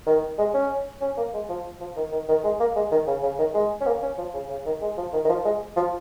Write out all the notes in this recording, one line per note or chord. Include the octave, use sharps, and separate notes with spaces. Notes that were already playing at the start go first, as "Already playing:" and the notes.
D#3
G#3
C#4
C#4
A#3
G#3
F3
F3
D#3
D#3
D#3
G#3
A#3
G#3
D#3
C#3
C#3
D#3
G#3
C#4
A#3
C#4
F3
C#3
C#3
D#3
G#3
F3
D#3
D#3
F3
G#3
F3